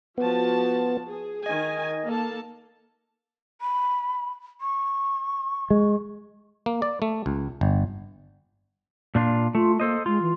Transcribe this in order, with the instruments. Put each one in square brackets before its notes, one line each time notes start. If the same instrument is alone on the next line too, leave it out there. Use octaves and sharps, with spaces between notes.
[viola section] F3 F#4 A5 [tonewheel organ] B3
[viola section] G#4
[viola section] D#3 G#5 [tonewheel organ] D#5
[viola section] A#3 A4 A5
[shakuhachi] B5
C#6
[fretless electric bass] G#3
[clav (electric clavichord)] A#3
D5
A3
C#2
G1
[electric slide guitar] A#2 D4 F4
[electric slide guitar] A3 [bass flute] F4
[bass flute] A#3 [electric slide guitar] A4 C5 D#5
[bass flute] G#3 [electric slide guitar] F4
[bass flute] E3